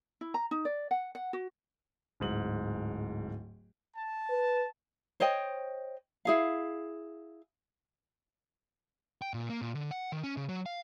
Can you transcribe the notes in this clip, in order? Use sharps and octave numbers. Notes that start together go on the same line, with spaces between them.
E4
A#5
D#4
D5
F#5
F#5
F#4
D1 G#2 F#7
A5
B4
C5 C#5 D#5 G5
E4 G#4 F5
G5
A#2
A#3
A#2
D3
F#5
D#3
C#4
C#3
F#3
F5